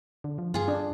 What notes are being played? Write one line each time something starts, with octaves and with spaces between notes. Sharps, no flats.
D3
F3
G2 F4 G#4
D4